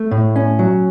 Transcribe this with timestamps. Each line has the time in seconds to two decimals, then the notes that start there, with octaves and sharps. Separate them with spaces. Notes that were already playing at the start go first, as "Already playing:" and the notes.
Already playing: A3
0.11 A2
0.36 C#4
0.59 F#3